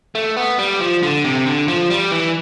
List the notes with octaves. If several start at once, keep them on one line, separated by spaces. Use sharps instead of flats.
A3
B3
G3
F3
D3
C3
D3
F3
G3
E3